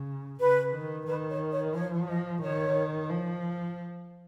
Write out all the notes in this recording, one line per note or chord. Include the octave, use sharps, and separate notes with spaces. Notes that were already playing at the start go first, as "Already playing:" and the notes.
Already playing: C#3
C#3 B4
D#3
D#3 B4
C#5
C#5
F3 C#5
D#5
D#3 C#5
F3